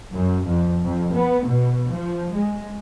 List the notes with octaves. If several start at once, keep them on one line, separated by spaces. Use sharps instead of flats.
F#2
F2
F2
B3
B2
F3
G#3